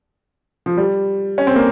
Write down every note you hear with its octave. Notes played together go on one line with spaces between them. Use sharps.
F3
G3
C#4
C4
A#3